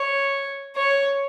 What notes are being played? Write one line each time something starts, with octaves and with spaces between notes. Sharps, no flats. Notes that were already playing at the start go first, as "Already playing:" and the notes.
Already playing: C#5
C#5